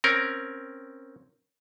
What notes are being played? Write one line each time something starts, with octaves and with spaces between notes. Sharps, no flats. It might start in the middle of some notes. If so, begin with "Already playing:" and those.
C4 C#4 A#4